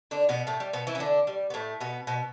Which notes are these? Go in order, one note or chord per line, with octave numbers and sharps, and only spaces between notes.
D3 D4
B2 B3
A2 A3
G3
B2 B3
E3 E4
C#4
D3 D4
G3
B3
A2 A3
B2 B3
B2 B3